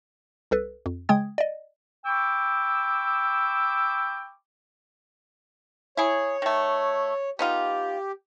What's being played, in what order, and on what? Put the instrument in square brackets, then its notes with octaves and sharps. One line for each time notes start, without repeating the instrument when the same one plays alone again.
[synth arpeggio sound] C2 A4 B4
F2
C#3 G#3 G5 D#6 G#6
D5 D#5
[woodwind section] G5 B5 C#6 D6 E6
[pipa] E4 G#4 [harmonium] C#5
[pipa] D#3 A3
[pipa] B3 D#4 F4 [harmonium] G4